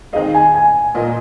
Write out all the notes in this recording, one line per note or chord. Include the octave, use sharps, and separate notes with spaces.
D#3 C4 D#4 G#4 D#5 F5
G#5
G#5
A#2 A#3 F4 A#4 D#5